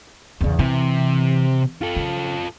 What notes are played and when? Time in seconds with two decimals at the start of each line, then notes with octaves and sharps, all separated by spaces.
0.41 E2 C#3
0.59 C3 E3
1.81 F4 A4
1.96 C#3